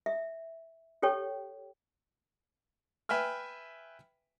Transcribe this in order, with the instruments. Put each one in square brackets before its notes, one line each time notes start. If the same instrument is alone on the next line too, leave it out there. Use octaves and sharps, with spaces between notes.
[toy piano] E5
G4 A4 C#5 G5
[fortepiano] B4 E5 G5 G#5 F6